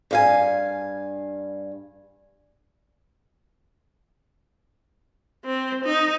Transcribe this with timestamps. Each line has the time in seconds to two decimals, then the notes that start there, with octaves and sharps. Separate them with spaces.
0.11 G2 F5 G#5
5.45 C4
5.85 D#4